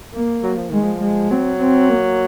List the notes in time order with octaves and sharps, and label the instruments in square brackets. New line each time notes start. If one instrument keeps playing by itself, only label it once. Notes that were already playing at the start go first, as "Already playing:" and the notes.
[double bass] A#3
[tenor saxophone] F#3
F3
[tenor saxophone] D#3 [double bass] G#3
[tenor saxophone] F3
[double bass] G#3
[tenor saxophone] F#3 [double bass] C4
[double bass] C4
A#3